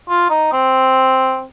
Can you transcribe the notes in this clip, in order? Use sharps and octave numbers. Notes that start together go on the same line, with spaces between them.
F4
D#4
C4